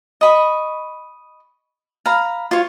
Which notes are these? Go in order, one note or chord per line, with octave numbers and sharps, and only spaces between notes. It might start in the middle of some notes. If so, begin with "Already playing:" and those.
D#5 B5 C#6
F5 A#5 B5
F4 C#5